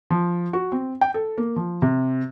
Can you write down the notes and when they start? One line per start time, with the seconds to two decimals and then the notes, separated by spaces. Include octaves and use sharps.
0.10 F3
0.53 F#4
0.72 C4
1.01 G5
1.14 A4
1.38 A#3
1.56 F3
1.82 C3